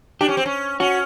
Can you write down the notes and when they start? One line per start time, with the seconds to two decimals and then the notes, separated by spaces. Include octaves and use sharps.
0.21 D4 G4
0.29 C#4
0.37 C4
0.46 C#4
0.80 C#4 F#4